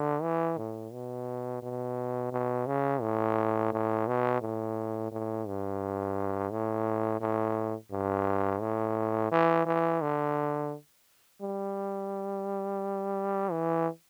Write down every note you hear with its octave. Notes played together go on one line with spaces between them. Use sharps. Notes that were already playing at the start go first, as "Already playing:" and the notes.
Already playing: D3
E3
A2
B2
B2
B2
C#3
A2
A2
B2
A2
A2
G2
A2
A2
G2
A2
E3
E3
D3
G3
E3